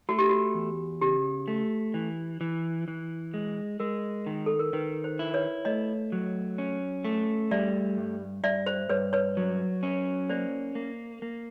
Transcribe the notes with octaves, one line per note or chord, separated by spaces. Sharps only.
A3 F#4
G4
F#4
E2
C#3 G4
A3
E3
E3
E3
G#3
G#3 A#4
D#3
A4
A#4
D#3 B4
C5
E4
B4 C#5
A3 C#5 D#5
F#3
C#4
A3
G3 D5 E5
G2
G2 D5 E5
C5
G2 B4 C#5
B4 C#5
F#3
C#4
A#3 C5 D5
A#3
A#3